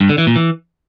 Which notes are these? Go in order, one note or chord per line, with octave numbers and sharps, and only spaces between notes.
G2
D3
E3
A#2
E3